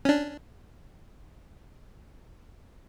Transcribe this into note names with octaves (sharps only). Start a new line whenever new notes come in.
C#4 D4